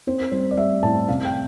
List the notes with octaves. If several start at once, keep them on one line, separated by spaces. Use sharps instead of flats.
C4 C5
G3 C5
D5
G3 E5
A2 A5
C3 F5
G5